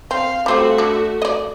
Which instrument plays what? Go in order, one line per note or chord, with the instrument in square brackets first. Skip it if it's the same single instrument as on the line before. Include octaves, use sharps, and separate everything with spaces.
[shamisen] C4 [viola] F5
[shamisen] G3 C4 F4 [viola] A3 F#4
[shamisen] D3
D5 D#5